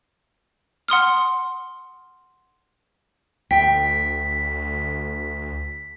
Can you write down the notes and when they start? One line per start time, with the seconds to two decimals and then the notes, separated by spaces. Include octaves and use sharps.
0.88 F#5 C6 D#6 F6
3.51 D2 G5 B6